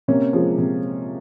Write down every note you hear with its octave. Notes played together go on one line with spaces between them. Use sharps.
C3 A#3 C#4
F3 G#3
C3